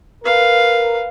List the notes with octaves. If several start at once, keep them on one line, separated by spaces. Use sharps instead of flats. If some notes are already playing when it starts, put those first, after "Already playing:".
A#4 B4 F5